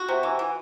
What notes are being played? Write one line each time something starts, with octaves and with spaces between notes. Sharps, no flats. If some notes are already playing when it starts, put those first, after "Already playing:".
Already playing: F#4
C3
E3
E3